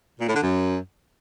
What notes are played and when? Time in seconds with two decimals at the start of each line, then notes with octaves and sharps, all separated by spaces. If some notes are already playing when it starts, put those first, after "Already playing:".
0.19 A#2
0.27 A2
0.34 D3
0.42 F#2